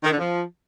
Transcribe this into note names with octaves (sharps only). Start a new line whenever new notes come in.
D#3
D3
F3